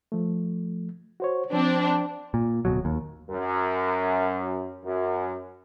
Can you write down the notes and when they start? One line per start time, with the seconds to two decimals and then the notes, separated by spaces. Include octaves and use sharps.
0.12 F3 A3
1.20 F#4 C5 C#5
1.53 F3 C4 D4
2.34 A#2
2.65 D1 B2 F#3
2.85 D#2
3.30 F#2
4.83 F#2